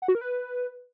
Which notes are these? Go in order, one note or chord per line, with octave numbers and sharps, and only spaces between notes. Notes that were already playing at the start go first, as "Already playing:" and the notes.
F#5
F#4
A#4
B4